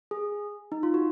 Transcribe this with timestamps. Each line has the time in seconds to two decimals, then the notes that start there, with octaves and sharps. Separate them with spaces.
0.11 G#4
0.72 D#4
0.83 F4
0.94 F#4